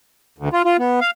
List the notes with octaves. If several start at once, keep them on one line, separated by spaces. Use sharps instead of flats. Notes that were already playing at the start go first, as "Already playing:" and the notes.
D2
F4
F4
B3
F5